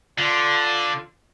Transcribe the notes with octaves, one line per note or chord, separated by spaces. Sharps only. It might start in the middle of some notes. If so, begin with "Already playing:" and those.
D3 F4